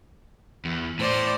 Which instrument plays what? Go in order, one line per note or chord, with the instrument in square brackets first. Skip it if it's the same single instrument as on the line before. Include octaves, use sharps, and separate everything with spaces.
[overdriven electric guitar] E2
[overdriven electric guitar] A2 [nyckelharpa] C5 D5